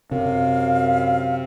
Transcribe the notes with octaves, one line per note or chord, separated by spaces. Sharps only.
F#2 C3 F5